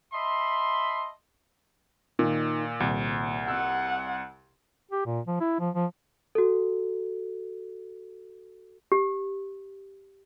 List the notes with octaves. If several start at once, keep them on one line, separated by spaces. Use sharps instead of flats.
D#5 E5 A5 B5 C6
A#2 D#3
D#1 C2
F#5 E6
G4
A#2
F3
E4
F3
F3
F#4 A4
G4